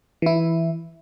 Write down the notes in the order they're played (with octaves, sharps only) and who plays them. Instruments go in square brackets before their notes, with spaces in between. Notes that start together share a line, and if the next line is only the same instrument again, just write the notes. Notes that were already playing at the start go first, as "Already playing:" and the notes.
[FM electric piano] E3 E4